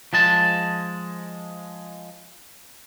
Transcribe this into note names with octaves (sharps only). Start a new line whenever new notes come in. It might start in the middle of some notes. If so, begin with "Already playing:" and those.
F3 G#3 A5